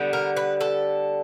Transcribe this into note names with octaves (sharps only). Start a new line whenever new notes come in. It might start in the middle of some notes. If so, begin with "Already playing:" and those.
Already playing: D3 G3 B3
A#4
B4
A4